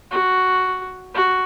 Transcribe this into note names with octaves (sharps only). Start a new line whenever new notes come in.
F#4
F#4